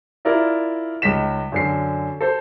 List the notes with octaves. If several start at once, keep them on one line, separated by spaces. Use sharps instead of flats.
E4 F4 A#4 D5 E5
C#2 D#4 B6 E7
F#2 D3 C7
A4 C5